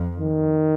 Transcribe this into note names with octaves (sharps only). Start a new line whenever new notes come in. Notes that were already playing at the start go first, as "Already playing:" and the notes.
Already playing: F2
D#3